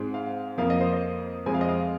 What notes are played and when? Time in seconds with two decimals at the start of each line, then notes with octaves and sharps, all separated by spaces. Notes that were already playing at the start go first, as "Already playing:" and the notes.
Already playing: G#2 G#3 C4
0.14 F5
0.58 F2 F3 A#3 F5
0.70 D#5
0.81 C5
0.93 D#5
1.46 F2 F3 G#3 C4 G#5
1.54 F5
1.61 D#5
1.68 F5